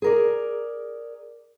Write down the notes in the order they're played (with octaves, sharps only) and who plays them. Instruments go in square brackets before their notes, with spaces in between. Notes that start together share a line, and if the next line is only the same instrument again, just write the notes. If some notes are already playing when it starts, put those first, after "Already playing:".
[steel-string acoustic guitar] G#4 A#4 D5